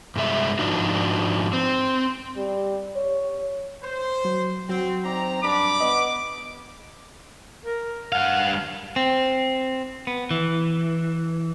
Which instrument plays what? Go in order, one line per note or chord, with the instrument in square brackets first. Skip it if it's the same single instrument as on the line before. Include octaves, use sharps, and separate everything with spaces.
[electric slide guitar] G2 C3 G#3 E5
G#2 F3 D4 D#4 F#4
C4
[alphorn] G3
C#5
[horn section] C5
[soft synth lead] F#3
[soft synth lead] F#3 [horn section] C4 [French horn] F#4
[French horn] C4 [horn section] D#4 D5 A#5
[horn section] G2 B5 [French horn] D4 [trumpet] D6
[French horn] B3 [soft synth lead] D#5
[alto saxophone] A#4
[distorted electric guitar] G2 F5 [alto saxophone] F#5
[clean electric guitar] C4
B3
E3